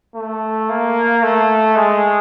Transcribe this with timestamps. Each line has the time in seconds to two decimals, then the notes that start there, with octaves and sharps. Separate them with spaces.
0.15 A3
0.69 A#3
1.23 A3
1.76 G#3